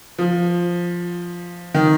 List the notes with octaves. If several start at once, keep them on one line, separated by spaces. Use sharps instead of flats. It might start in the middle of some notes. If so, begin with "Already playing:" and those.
F3
D#3